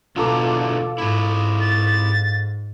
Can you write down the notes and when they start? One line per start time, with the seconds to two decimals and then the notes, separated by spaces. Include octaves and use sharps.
0.16 E2 B2 D3 F4 A4 A#5 D6
0.98 G#2 E4 G4
1.60 A6